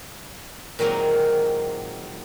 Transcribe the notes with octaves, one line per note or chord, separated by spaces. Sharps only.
A#2 D#3 F#3 G#3 A#3 C4